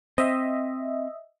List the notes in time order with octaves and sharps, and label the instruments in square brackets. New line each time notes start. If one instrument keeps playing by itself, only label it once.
[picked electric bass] C4 [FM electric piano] D#5 E5